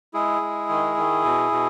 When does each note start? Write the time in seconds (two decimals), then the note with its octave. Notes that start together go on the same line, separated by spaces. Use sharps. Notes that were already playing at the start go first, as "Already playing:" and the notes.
0.14 G#3 E4 G#4
0.41 G#3
0.69 D#3
0.97 D#3
1.24 B2
1.52 B2